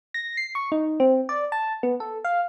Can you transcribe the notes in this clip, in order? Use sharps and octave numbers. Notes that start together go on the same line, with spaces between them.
A#6
C7
C#6
D#4
C4
D5
A5
B3
A4
F5